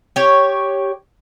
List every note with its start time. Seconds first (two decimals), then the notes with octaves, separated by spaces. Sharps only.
0.16 G4 C#5